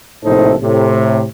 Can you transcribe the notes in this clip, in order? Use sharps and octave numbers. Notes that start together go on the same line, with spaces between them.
A#1 A2 C3 D#4 A4 C5
A2 C3